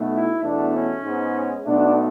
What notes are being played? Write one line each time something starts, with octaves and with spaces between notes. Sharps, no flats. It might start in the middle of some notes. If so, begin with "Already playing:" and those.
Already playing: B1 B2 A3
E4
E2 B2 A3 D4
C#4
G#2 G#3 B3
B1 B2 A3 D4